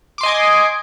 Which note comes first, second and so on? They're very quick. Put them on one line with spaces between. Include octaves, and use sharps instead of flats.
D6 C6 D#5 G#5